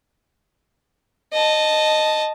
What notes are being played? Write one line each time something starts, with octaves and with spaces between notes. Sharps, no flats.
D#5 A5